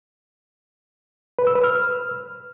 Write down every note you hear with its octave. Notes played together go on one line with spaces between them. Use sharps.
B4
E6
B4
F6